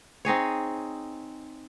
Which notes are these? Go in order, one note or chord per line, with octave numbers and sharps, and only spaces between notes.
C4 D#4 G#4 C#5